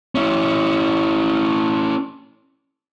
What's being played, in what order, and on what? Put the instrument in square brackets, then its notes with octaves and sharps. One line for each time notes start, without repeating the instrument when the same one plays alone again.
[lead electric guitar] C#4 E4